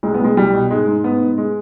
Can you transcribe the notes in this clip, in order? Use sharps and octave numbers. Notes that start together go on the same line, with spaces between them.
C2 G#3
B3
C2 G#3
C2 G3
B2
G#2 G#3
G#2
G#2 B3
G#2
G#3